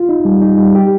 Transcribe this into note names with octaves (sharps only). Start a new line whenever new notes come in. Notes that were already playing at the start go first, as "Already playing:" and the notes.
Already playing: F4
D#4
G3
D#4
G3
G4